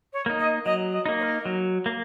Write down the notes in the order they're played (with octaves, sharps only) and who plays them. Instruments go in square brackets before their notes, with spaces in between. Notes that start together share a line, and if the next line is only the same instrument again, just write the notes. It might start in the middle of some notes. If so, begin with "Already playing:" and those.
[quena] C#5
[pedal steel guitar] A#3 D#4
[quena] D#5
[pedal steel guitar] F#3 [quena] D#5
[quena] D#5
[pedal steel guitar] A#3 D#4
[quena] C#5
A#4
[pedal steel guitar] F#3
A#3